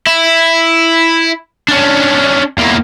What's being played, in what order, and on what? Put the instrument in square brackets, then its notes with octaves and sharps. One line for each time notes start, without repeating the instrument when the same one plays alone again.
[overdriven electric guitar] E4
C#4 D4
E2 A#3